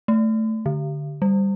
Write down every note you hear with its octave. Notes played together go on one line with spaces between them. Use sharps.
A3
D3
G3